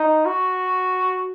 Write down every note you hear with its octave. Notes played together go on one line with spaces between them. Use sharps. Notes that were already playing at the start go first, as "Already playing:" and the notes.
Already playing: D#4
F#4